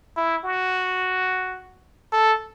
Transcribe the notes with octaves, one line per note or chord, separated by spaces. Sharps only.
E4
F#4
A4